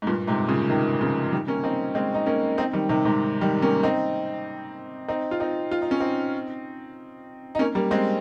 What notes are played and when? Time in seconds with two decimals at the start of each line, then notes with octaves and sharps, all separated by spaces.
0.02 G#2
0.07 G2 A#2
0.27 G#2 C3
0.48 A#2 C#3
0.69 C3 D#3
1.01 C#3 F3
1.32 D#3 G3
1.47 A#3 C#4
1.64 C4 D#4
1.95 G#3 C4
2.14 D#4
2.26 A#3 C#4
2.58 C4 D#4
2.73 D#3 G3
2.89 C3 D#3
3.05 G#2 C3
3.41 D#3 G3
3.62 A#3 C#4
3.83 C4 D#4
5.08 C4 D#4
5.31 F4
5.40 C4 D#4
5.71 F4
5.82 D#4
5.91 C#4
6.00 C4 D#4
7.55 D#4
7.59 A#3 C#4
7.75 G3 A#3
7.91 G#3 C4